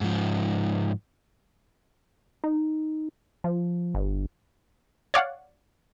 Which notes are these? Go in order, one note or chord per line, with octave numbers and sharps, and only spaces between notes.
G#2 F3
D#4
F3
G1
C#5 D5 F5 F#5